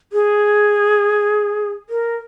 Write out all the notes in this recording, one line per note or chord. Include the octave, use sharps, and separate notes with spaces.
G#4
A#4